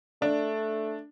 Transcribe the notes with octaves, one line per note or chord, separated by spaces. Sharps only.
A3 D4